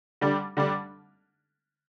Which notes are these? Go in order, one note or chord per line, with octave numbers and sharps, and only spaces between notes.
D3 G3 D4
D3 G3 D4